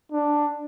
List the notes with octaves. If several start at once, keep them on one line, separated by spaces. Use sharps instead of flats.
D4